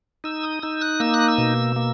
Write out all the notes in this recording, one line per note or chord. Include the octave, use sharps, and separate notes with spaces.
D#4 E6
D#6
D#4 E6
F#6
A#3 E6
F#6
E6
B2
A#3